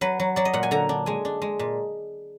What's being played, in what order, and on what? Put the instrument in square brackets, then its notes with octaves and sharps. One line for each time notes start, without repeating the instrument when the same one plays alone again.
[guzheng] F#3 B4
F#3
F#3 D5
D#5
A#2 F#5
G#5
D3 A#5
D4
G#3 G#5
D4
G#3
A#2